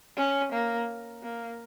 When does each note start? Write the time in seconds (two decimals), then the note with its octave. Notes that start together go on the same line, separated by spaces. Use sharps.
0.17 C#4
0.53 A#3
1.23 A#3